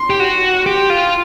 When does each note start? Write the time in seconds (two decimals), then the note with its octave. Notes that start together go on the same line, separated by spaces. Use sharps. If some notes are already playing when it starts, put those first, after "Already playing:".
Already playing: C6
0.10 G4
0.20 F#4
0.66 G4
0.90 F4